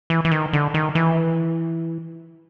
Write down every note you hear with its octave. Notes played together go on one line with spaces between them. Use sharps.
E3
E3
D#3
D3
D#3
E3